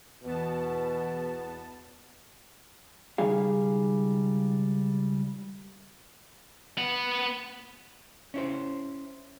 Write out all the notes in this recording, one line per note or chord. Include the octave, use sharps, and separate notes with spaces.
E2 B2 B3 A5
C#2 D#3 G3 G#4 F5
B3 F#5
C#4 E4 C5